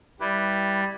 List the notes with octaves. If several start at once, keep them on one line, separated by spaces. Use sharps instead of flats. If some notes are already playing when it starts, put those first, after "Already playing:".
G3 E4 G4 B4